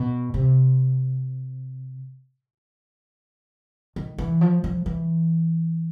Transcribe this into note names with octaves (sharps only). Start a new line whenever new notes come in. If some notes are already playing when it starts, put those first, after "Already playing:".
Already playing: B2
C3
D#3
E3
F3
F3
E3